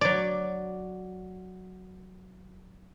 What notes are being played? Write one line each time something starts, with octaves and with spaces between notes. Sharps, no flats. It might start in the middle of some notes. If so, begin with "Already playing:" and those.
F#3 D5